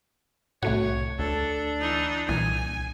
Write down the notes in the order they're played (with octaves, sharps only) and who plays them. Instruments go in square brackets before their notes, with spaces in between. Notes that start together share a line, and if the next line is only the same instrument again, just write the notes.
[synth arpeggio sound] C2 A3 F#4 [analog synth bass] A2 [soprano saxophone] C#5
[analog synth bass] D2 [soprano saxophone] D4 [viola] A4
[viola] E3 D#4
[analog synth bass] C2 [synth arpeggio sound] A#2 E3 [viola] G#5